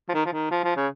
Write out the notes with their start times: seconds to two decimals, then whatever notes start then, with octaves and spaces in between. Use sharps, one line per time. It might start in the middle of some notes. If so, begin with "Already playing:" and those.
0.09 F3
0.14 D#3
0.26 F3
0.32 D#3
0.51 F3
0.64 F3
0.76 C#3